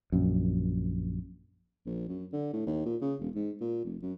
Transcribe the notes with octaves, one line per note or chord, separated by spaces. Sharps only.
A#1 F#2
A#1
F#2
D3
A2
D#2
A#2
C#3
E1
G#2
A#2
F1
F#2